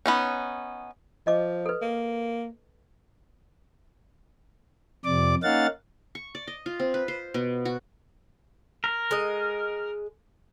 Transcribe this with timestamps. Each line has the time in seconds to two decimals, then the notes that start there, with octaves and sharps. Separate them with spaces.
0.06 B3 C#4 D#4
1.27 F3 D#5 D6
1.66 A4 B4
1.82 A#3
5.05 F2 C3 D5 D6
5.43 A#3 C#4 D#4 F5 F#5 A6
6.15 C#6
6.35 D5
6.47 D#5
6.66 F4
6.80 C4
6.94 B4
7.08 C5
7.34 B2
7.65 F#4
8.84 A#4
9.11 G#3 D#5